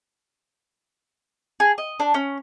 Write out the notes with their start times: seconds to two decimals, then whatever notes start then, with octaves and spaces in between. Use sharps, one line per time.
1.60 G#4
1.78 D#5
2.00 D4
2.14 C#4